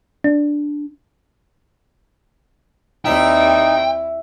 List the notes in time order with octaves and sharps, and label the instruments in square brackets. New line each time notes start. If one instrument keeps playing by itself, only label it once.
[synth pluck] D4
[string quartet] D#2 G3 C4 [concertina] D#4 [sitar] E4 [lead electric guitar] G5